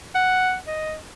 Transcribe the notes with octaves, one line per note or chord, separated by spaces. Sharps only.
F#5
D#5